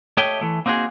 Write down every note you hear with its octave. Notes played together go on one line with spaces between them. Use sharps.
A3 G4 C#5 D#5 E5 G5
E3 A3
A#3 C4 D#4 F#4 G#4